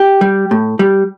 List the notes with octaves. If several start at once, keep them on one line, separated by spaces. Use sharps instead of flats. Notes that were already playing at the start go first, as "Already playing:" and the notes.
Already playing: G4
G3
A2
G3